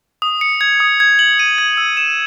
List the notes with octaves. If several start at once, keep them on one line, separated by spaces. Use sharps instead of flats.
D#6
C#7
G#6
D#6
G#6
F#7
D#7
G#6
E6
E7